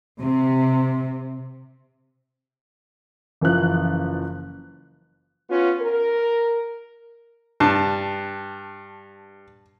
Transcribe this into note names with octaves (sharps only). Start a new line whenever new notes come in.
C3
F#1 E3 F3 F#6
B3 C#4 F4
A#4
G2 A5